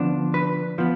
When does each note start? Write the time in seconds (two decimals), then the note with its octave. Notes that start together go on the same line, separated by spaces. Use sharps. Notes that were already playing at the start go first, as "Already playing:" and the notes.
Already playing: D3 F3 B3 D4
0.34 B4
0.78 F3 B3